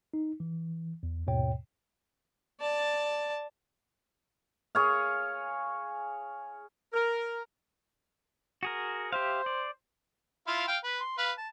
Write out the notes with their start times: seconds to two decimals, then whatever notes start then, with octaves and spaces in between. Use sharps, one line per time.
0.14 D#4
0.40 E3
1.03 E2
1.27 D#2 G#2 B2 C#5 G5
2.61 D5 A5
4.75 G#4 C#5 F5
6.93 A#4
8.63 F#4 G#4 A#4
9.13 G4 C5 E5 F5
9.46 D5
10.47 E4 F4 F5
10.68 F5 G5
10.84 B4
11.01 C6
11.18 B4 F5
11.38 A5